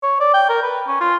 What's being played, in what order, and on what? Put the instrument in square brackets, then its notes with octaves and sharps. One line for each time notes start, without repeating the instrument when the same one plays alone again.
[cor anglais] C#5
D5
G5
A#4
B4
C#4
F4